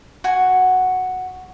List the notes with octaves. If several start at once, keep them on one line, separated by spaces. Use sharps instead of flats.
F#4 F#5 G#5